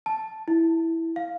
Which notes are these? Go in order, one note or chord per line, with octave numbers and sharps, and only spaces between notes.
A5
E4
F5